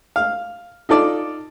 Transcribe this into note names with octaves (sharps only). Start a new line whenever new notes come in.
F5
D#4 F4 A4 D5